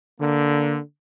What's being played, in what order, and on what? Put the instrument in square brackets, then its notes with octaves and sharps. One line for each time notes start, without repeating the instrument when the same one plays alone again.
[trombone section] D3 A#3